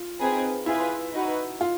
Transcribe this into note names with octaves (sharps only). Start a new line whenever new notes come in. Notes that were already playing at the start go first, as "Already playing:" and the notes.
Already playing: F4
C4 D#4 G#4 B4
E4 F4 G#4 B4
D#4 F#4 B4
F4